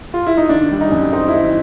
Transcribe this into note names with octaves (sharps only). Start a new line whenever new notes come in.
F4
E4
D#4
D#3 D4
G3
D#4
F#2
C4 D#4
E4
D#3 D#4